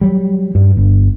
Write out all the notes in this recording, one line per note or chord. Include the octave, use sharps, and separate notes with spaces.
F#3 G3
G2
G1